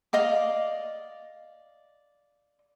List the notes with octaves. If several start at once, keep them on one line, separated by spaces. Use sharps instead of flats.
D5 D#5 F5 D6